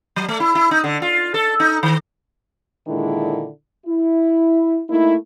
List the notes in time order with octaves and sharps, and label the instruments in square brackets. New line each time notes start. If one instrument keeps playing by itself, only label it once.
[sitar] F#3
A3
E4
E4
D#4
D3
F4
A4
D#4
D#3
[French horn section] A#2 D3 D#3 G#3 D4 E4
E4
A3 A#3 D#4 E4